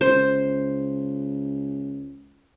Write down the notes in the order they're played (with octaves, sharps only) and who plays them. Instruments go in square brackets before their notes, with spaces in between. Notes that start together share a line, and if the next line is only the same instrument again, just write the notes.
[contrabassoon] C#2 [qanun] C5